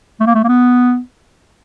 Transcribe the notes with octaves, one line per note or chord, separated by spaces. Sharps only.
A3
A#3
A3
A#3
B3